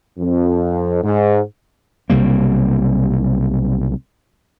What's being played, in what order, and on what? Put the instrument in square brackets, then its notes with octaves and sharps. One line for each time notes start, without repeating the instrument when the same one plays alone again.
[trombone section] F2
G#2
[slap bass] B1 C3 G3 A#3